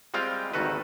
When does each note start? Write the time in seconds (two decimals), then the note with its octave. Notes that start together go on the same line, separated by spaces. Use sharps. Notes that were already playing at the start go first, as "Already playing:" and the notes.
0.14 G3 G#3 C4 F4 F5 G5
0.54 G#1 D2 D#3 F#4 A4 B4